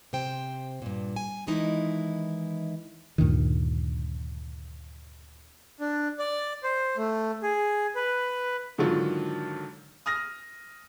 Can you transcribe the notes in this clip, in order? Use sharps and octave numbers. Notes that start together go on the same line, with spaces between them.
C3 C5 G5
G2 A#2
G#5
D#3 E3 G#3 D#4 E4
D2 G2 A#2 D#3
D4
D5
C5
A3
G#4
B4
G#2 D3 D#3 F#3 F4
D#6 F6 A#6